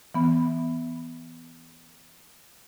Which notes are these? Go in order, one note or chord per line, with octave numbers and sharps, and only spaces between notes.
E3 B3